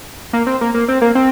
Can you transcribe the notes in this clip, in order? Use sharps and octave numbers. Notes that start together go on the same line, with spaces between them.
A#3
C4
A#3
A#3
C4
A#3
C4